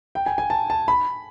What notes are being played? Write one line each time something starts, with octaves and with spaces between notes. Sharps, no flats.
G5
G#5
G#5
A5
A5
B5